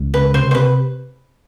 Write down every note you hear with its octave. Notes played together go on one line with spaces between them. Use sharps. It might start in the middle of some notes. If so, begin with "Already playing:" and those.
Already playing: C#2
C#3 B4
C3 C5
C5
C3 B4